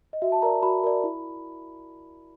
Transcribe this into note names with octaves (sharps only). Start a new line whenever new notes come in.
D#5
F#4 E5
A5
A#4 D5 A#5
F#4 B5
A#4 D5
E4